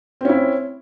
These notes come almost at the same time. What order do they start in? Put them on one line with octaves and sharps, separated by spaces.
C4 C#4 E4